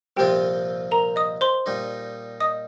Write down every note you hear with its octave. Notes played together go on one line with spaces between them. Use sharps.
C2 A#2 F3 C4 F4 G4 G5
A#4 A#5
D#5 D#6
C5 C6
A#2 G3 D#4
D#5 D#6